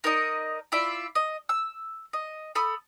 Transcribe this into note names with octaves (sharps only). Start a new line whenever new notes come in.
D#4 A#4 D5 D#5
E4 F4 D5 E5
D#5
E6
D#5
A4 B5 D#6